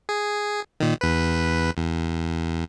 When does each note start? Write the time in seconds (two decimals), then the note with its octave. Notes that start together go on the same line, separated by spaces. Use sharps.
0.09 G#4
0.80 A#2 D#3
1.01 E2 B4
1.77 E2